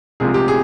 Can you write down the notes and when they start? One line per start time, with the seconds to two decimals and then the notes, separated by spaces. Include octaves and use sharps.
0.20 C2 C3 F3 G#3 G#4
0.34 G4
0.48 G#4